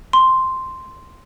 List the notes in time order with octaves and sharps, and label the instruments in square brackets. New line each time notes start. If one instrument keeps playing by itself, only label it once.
[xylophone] C6